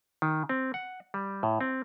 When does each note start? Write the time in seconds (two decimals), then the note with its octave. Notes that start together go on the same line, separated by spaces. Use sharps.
0.22 D#3
0.49 C4
0.74 F#5
1.14 G3
1.43 A2
1.61 C4